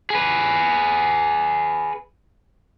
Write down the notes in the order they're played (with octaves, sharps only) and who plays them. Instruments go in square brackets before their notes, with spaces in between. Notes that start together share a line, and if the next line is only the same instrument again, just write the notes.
[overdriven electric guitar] G#4 B4